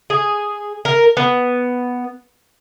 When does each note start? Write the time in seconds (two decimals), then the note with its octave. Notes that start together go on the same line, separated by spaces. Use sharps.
0.10 G#4
0.85 A#4
1.17 B3